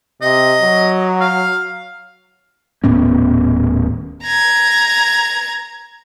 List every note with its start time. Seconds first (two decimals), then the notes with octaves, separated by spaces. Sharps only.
0.22 C3 D#5
0.61 F#3
1.21 F5
2.84 D#1 A2 B3 C#4
4.23 A#5 G#6